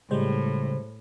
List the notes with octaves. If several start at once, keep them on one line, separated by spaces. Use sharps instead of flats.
A2 C#3 G3 G#3 C5